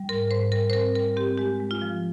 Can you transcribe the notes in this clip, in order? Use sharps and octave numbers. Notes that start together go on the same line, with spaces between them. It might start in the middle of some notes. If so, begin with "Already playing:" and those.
Already playing: G3
G#2 A#4
G#2 C5
G3 A#4
C5
C4 A#4
G3 A#4
C4 G4
G#3 G4
G#3
F4
F3